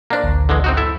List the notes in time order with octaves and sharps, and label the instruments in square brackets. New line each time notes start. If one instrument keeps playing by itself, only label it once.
[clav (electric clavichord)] A#3 D4 [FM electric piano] C5 D5 A#5
[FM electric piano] A1 D2
[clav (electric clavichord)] D3 E3 G#3
C4 D#4 F#4
[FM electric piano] F#2 [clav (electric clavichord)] E4 A4 E5